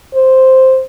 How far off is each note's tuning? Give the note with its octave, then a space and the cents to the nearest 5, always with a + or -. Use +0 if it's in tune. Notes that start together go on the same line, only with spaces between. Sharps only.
C5 +0